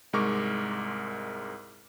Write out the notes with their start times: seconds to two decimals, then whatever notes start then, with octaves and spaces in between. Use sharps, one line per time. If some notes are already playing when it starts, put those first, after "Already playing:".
0.13 C2 G#2 G#3 A#4 C#6 D6